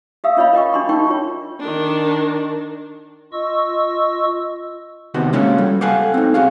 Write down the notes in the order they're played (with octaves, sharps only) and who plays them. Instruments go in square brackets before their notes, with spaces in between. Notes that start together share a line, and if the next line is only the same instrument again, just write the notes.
[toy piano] G4 E5 F5 D#6 E6
C#4 F4 C#5 D#5 F5 B5
A#4 D#5 G5 C#6
D4 F#4 B5 C6 D6
C#4 D#4 A#4 G5 C#6
F4 C#5
[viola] D#3 D4
[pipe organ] F4 D#5 C#6 E6
[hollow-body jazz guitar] C3 D#3 B3 F#4
G#3 A#3 C#4 F4 F#4 A4
G3
G4 A4 F5 F#5 G#5
C4 D#4
F#4 G#4 F5